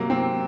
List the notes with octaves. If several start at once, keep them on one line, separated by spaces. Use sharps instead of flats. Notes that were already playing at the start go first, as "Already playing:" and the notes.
Already playing: C3 F#3 A#3
C4